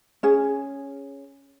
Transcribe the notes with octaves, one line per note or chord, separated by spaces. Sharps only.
C#4 G#4